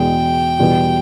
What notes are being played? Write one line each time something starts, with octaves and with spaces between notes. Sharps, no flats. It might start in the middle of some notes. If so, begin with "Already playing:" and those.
Already playing: E2 B2 G#3 G5
E2 B2 G3 B3